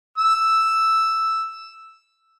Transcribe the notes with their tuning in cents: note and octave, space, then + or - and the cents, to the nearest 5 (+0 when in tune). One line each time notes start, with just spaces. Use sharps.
E6 +0